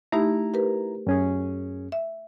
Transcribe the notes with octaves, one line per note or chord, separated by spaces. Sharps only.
A3 D#4 E4 G4 A#5
G4 A#4 B4
F#2 C#4 G#4
E5